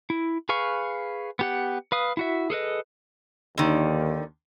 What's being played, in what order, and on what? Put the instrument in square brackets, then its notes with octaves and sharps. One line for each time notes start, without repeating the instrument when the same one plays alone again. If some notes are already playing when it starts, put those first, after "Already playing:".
[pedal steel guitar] E4
G#4 B4 F5 C#6
B3 G4 F#5
B4 F5 D#6
E4 F#4 E5
G#4 A4 B4 D#5
[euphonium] D#2 [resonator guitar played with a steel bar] D3 D#3